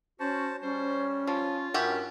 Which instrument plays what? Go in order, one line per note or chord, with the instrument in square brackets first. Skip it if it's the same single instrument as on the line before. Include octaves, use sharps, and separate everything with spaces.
[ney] C#4 [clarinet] F#4 [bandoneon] C5 A5
[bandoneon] G3 [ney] C#4 [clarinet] C5
[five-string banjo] F3 [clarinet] F4
[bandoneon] G2 C#4 [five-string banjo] F#4 G4 E5 [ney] A#4